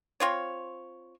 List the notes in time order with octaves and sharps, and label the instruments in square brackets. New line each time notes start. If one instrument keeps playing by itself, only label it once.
[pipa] C4 F4 C#5